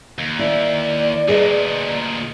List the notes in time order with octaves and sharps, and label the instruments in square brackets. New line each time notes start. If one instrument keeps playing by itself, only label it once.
[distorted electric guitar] D#2
[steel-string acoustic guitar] E4 A#4 [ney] D5
[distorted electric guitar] D2 A#2 [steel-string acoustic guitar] G#4 B4 D#5